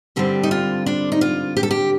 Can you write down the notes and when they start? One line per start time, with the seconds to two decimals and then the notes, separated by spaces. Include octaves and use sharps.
0.16 G2 D3 G3 C4 G4
0.43 D#4
0.51 F4
0.86 D4
1.12 D#4
1.21 F4
1.57 G4
1.63 A4
1.71 G4